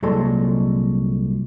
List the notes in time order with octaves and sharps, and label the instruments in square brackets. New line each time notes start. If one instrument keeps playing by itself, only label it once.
[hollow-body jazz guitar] C2 A#2 F#3 G#3 A4 C6